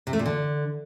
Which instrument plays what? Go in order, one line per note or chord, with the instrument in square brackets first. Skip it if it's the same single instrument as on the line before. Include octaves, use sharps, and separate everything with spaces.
[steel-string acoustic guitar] C3
A3
A#2
D3